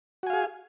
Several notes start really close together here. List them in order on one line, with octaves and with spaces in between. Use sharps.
F#4 G#5 F5 G#4